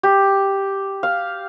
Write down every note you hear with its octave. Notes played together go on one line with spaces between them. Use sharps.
G4
F5